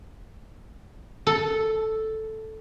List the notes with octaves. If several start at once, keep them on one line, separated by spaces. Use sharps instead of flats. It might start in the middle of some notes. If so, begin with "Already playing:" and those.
A4